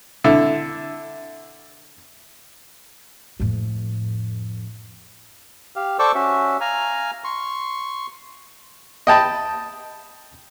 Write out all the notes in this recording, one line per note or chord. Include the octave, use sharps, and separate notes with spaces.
D3 E4
F2 A2
G4 F5
A4 C5 D5 C#6 D6 E6
C#4 F#4 E5
F5 G#5 A#5
C6 C#6
D#5 G5 A5 B5